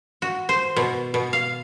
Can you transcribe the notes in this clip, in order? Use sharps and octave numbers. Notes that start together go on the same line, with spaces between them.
F#4
C5
B2
B2
F5